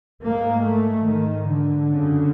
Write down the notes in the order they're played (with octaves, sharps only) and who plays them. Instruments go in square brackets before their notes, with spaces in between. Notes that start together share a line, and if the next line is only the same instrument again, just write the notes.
[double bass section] G#2 A#3
A3
G#2 D#3
D3
F#2 C#3